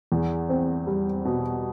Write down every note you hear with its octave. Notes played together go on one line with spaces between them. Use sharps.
E2
C4
G3
B2